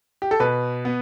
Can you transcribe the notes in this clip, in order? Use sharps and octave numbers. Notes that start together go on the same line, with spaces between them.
G4
A4
B2 B4
B3